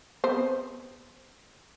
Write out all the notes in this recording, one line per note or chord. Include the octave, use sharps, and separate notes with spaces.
B3 C4 C5